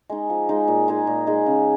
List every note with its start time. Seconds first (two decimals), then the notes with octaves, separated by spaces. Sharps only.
0.09 G#3 D#4
0.30 F3
0.49 G#3 D#4
0.68 A#2
0.88 G#3 D#4 G#4
1.07 A#2
1.27 G#3 D#4 G#4
1.46 C#3